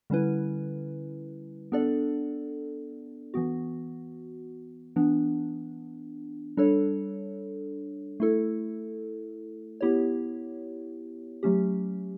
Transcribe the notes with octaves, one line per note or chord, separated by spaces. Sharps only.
D3 G3 C#4 E4 B4
B3 D4 A4 D5
E3 B3 F#4
E3 B3 D4
G3 D4 A4 C#5
A3 E4 A4
B3 E4 G4 C#5
F#3 A3 C#4 G4